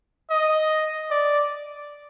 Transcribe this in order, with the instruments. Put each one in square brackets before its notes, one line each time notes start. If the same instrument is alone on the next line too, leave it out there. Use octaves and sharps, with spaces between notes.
[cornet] D#5
D5